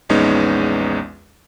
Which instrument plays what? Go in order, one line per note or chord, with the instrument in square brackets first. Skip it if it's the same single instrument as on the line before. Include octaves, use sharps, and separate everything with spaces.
[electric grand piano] A#1 E2 G#3 B3 C#4 D#4